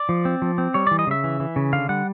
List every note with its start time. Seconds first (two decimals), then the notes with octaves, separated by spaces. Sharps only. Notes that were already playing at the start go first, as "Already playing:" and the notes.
Already playing: D5
0.09 F3
0.25 C4
0.42 F3
0.58 C4
0.74 G3 C#5
0.87 E3 D5
0.99 D#5
1.07 C#3 E5
1.24 E3
1.40 E3
1.56 C#3
1.73 D3 F5
1.89 G3 F#5